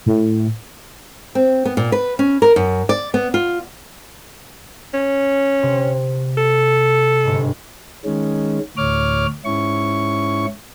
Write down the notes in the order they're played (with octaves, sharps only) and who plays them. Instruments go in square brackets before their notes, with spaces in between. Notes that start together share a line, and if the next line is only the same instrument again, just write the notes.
[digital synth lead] A2
[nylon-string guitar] C4
B3
A#2
B4
C#4
A#4
F#2
D5
B3
F4
[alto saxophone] C#4
[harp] C3
[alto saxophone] A4
[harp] G1 G#2
[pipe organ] D#3 G#3 C#4
D2 A2 C#5 D6 F6
G#2 C#4 E4 C#6